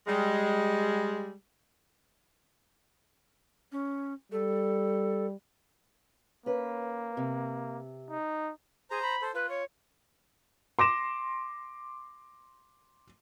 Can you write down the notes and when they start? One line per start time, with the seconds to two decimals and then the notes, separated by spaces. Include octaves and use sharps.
0.07 G3 G#3
3.72 C#4
4.32 G3 A4
6.46 A#3 C#4 B4
7.17 C3
8.10 D#4
8.91 G#4 C5 A#5
9.02 B5
9.22 A4 C5
9.34 F4 B4
9.49 C#5
10.79 C6 D6 A#6 E7